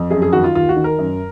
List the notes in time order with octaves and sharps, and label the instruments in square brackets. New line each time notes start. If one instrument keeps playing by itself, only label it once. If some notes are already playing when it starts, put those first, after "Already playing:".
Already playing: [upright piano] F2
F#2 G#4
G#4
D#3 F#4
F4
D#2 F4
F#4
D#3
A#4
F#2